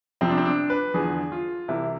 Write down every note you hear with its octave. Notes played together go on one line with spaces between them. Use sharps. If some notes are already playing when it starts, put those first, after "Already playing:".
F2 C3 F3 C4
D4
C4
D4
B4
E2 D3 F3 G#4
F4
C2 C3 E3 E4